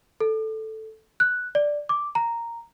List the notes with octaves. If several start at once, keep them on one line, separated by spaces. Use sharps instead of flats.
A4
F#6
D5
D6
A#5